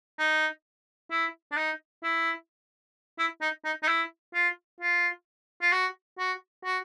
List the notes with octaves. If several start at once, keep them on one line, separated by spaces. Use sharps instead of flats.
D#4
E4
D4
D#4
E4
E4
D#4
D#4
D#4
E4
F4
F4
F4
F#4
F#4
F#4